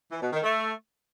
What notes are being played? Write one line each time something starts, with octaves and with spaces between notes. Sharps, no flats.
E3
B2
D#3
A3